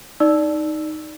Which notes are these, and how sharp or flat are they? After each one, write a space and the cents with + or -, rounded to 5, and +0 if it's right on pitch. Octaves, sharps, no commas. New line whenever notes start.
D#4 +0 D5 +0 E6 +0